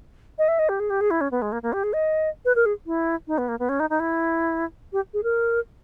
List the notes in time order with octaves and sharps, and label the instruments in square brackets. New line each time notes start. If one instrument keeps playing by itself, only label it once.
[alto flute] D#5
E5
D#5
G4
G#4
G4
G#4
E4
C#4
B3
G#3
A#3
A#3
G4
G#4
D#5
B4
A#4
G#4
E4
D#4
B3
A#3
B3
C#4
D#4
D#4
E4
G4
G#4
A#4